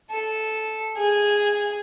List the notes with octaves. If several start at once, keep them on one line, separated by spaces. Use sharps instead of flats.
A4
G#4